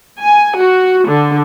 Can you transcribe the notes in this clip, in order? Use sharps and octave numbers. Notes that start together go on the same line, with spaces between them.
G#5
F#4
D3